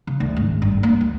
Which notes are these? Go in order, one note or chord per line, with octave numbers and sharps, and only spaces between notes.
C#3
D2
G#1
G2
A#3
D2